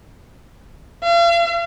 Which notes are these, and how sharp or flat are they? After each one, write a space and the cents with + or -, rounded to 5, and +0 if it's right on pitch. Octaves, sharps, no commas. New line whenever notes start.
F5 -40